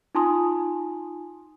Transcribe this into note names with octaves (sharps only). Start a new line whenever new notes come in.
D#4 F4 G#5 A5 C6 D#6